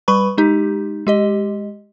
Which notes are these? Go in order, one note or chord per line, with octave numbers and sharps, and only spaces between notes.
G3 B4 B5 C#6
G#3 D#4 G4
G#3 G4 D#5